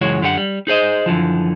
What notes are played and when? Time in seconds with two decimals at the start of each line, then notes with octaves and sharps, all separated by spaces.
0.01 C#2 F#2 E3 G#3 F#4 C#5
0.22 F#2 D3 G4 C5 F#5
0.37 G3
0.67 D#4 G#4 C5 D#5
1.06 F#2 D3 E3 F3